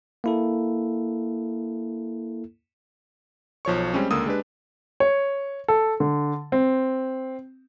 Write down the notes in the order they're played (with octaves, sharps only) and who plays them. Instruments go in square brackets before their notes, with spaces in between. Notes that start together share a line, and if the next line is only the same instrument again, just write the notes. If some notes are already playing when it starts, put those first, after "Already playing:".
[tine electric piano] A#3 E4 A4
[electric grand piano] B1 F3 C#5 C#6
G3 G#3 C4 C#4
C#2 D3 A#3 D#6 E6
G#3 D4 G4 B4
[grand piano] C#5
A4
D3
C4